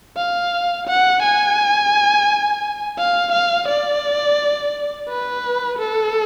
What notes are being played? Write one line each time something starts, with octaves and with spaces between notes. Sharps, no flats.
F5
F#5
G#5
F5
F5
D5
B4
A4